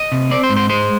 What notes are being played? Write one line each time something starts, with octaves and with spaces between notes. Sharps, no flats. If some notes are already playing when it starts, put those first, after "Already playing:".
Already playing: D#5
C3
C4 D5
C5
G#2
C5
G#3 C5